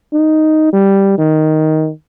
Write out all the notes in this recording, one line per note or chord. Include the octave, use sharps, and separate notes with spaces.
D#4
G3
D#3